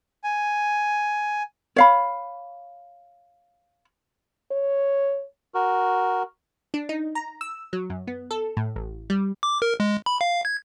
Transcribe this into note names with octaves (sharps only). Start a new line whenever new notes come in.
G#5
C#5 F5 B5
C#5
F#4 A#4
D4
D#4
A#5
E6
F#3
F#2
B3
A4
A2
A1
G3
D6
A#4
G#3
B5
F5
G#6